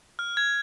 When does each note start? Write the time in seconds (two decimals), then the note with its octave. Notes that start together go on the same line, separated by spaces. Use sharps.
0.19 F6
0.37 G#6